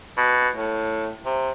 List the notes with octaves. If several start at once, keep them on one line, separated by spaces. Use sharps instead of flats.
B2
A2
C3